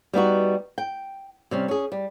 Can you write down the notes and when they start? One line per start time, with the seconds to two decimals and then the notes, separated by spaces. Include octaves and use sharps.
0.13 G3 B3 D#4 F#4
0.78 G5
1.51 C3 G3 C#4
1.68 C#4 G#4
1.92 G3